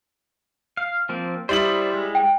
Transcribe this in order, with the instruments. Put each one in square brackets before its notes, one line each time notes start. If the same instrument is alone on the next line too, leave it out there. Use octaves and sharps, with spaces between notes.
[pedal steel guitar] F5
F3 A#3 C4
[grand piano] G3 E4 F#7 [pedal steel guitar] C5 D5 D#6
[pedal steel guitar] G#3
[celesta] G5